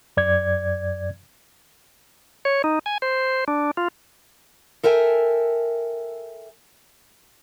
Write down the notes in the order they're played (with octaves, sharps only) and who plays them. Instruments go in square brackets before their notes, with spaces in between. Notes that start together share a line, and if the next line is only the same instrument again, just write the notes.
[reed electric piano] F#2 D5 G#6
[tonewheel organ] C#5
D#4
G#5
C5
D4
F4
[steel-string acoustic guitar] A4 A#4 E5 G5 G#5